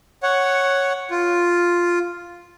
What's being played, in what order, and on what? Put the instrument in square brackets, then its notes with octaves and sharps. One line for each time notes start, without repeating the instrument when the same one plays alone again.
[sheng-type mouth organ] C#5 F#5
F4